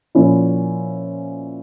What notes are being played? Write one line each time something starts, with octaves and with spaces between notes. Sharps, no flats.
A#2 F3 C#4 E4